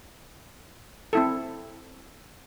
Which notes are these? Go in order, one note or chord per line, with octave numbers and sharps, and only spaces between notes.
C4 E4 A4